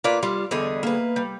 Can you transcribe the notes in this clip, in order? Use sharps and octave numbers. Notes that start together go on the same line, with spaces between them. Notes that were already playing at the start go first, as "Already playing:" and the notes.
A#3 F4 B4 D5
G3 F4
E2 D3 G3 G#4 D#5
A#3 B4
G3